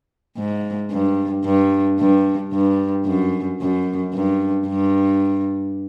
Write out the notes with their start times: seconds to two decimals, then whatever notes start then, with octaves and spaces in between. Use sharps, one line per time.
0.37 G#2
0.91 G2
1.44 G2
1.99 G2
2.53 G2
3.06 F#2
3.61 F#2
4.13 G2
4.67 G2